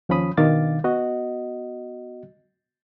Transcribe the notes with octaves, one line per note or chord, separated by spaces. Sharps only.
D#2 F3 C#4 B5 D#6
B2 D#3 D4 F5 D6 A6
B3 F#4 D#5